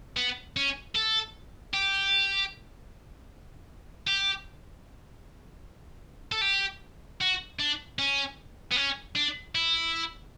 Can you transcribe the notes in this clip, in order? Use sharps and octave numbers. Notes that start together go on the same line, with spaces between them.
B3
C#4
A4
G4
G4
A4
G4
F#4
D4
C#4
B3
C#4
D4
E4